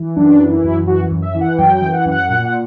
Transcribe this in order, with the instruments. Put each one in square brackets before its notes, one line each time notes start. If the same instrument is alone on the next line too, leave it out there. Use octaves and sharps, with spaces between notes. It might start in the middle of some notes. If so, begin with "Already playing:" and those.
Already playing: [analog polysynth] E3
F#2 D4
E3
E4
F#2
E3 F#4
F#2
E5
E3
F#5
F#2 G5
G5
E3
F#5
F#2
F#5
A#2 F#5
F#5